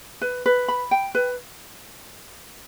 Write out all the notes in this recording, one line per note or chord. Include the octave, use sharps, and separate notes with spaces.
B4
B4
B5
G5
B4